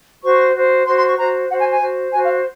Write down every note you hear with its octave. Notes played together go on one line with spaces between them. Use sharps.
F#4 C5 C#6
F#4 C5
F#4 C5 C6
C6
C#6
F#4 C5 A#5
F#4 C5 F#5
G#5
G#5
F#4 C5
F#4 C5 G#5
F5